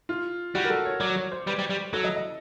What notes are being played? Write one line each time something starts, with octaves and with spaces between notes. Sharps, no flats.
F4
G3 F#4
A#4
A4
C#5
F#3 D5
C#5
C5
G3 B4
G3
G3
F#3 A4
D#5
D#5